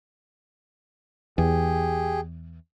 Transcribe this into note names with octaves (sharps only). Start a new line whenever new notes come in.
E2 G4 G#4